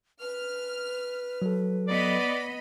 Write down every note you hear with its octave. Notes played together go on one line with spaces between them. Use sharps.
B4 F6
F#3 A4
B3 D5 D#5 B5